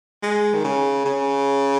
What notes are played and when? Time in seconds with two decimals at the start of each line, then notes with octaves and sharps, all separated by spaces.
0.23 G#3
0.54 D#3
0.64 C#3
1.05 C#3